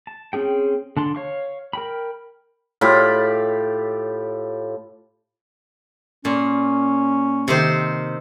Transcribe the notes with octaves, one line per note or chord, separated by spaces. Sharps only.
A5
C4 C#4 G#4 G5
D3 A5 C6
C#5 F5 C#6
A#4 G5 B5
A2 F4 G4 B5
A#2 C#4
C3 D#3 C5